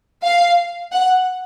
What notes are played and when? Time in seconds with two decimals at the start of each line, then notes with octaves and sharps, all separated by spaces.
0.23 F5
0.93 F#5